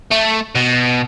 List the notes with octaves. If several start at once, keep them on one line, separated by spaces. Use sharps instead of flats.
A3
B2